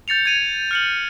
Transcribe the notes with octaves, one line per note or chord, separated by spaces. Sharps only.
G6 A6 C#7 F7
G#6 D#7 F7
F6 C#7 F#7